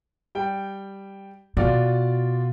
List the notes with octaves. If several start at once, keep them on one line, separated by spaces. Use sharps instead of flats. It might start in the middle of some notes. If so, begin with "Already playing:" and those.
G3 G5
B2 F4 F#4 D5